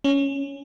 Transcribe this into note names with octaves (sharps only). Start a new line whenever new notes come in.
C#4